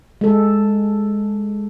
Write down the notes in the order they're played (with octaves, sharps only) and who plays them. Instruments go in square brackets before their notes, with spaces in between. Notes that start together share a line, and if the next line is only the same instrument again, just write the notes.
[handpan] G#3 A4